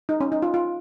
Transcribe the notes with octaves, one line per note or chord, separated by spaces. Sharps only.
D#4
C#4
D#4
F4
F4